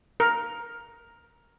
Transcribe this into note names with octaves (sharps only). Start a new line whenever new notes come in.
A#4